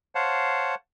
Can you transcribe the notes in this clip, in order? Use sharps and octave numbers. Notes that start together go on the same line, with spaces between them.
C5 C#5 F5 F#5 A5